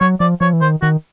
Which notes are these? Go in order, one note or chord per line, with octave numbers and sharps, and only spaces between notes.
F#3 C#5
F3 D5
F3 C#5
E3
D#3 C5
D#3 F#4